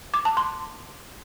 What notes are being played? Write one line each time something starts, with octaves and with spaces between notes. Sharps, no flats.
D6
A5
C6